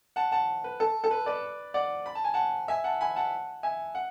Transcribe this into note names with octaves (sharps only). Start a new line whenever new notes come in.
F#5 A5
F#5 A5
B4
A4
A4
B4
B4 D5
D5 F#5
B5
A5
G#5
F#5 A5
E5 G#5
F#5 A5
G#5 B5
F#5 A5
E5 G#5
F#5